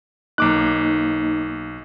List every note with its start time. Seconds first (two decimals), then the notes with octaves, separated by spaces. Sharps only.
0.38 B1 A#3 D#4 D6 F#6